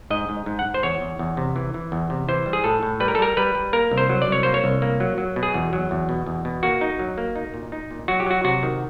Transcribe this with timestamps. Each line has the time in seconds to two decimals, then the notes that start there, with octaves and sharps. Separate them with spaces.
0.10 G#2 D#5
0.29 G#2
0.46 G#2
0.59 F#5
0.65 G#2
0.74 C5
0.83 E2 C#5
1.01 E2
1.19 E2
1.37 C3
1.56 E3
1.74 E3
1.92 E2
2.10 C3
2.28 E3 C5
2.46 G3
2.53 G#4
2.64 A2 A4
2.83 A2
3.00 G3 B4
3.08 A#4
3.15 A4
3.19 G3 A#4
3.37 G3 B4
3.55 G3
3.73 A#3 A#4
3.91 C2
3.98 C5
4.09 F#3
4.22 D5
4.28 C2 C#5
4.43 A#3 C5
4.54 C#5
4.64 C2
4.82 A#3
5.00 F#3
5.18 F#3
5.36 B2
5.43 G#4
5.54 E2
5.73 F#3
5.91 E2
6.09 B2
6.26 E2
6.45 B2
6.63 A#3 F#4
6.81 D#4
6.99 F#3
7.18 A#3
7.36 D#4
7.54 A#2
7.72 D#4
7.91 A#2
8.08 F#3 F#4
8.20 G4
8.26 F#3 F#4
8.44 C3 F#4
8.63 D#3